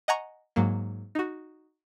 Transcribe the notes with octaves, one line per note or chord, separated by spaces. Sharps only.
D#5 F#5 G#5 A#5 C#6
G#2 F#3 A#3
D#4 F#4